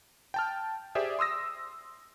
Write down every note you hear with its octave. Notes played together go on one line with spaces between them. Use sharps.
G5 A5 F6
G4 G#4 C5 D5 E5
C6 D#6 E6 A#6